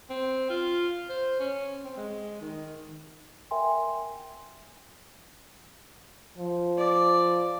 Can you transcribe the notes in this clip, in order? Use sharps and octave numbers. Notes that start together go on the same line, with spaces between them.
C4
F4
C5
C#4
C4
G#3
D#3
A#4 E5 G5 G#5 C6
F3
D5